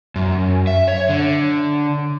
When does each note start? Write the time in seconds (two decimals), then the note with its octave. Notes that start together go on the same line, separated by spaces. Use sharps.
0.16 F#2
0.67 E5
0.88 C#5
1.09 D3